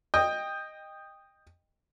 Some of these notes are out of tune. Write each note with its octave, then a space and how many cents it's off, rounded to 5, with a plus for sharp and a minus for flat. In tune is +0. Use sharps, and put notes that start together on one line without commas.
D#5 -5 G5 +15